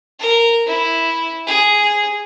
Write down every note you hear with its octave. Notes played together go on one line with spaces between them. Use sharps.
A#4
E4
G#4